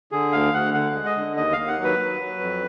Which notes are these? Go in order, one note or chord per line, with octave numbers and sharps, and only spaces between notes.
D3 G#4
D2 F5
D2 F#5
D3 F#5
G#3
D#5
D3
D#2 D#5
F5
D#2
F#5
F#3
B4
F#3
F#3
F2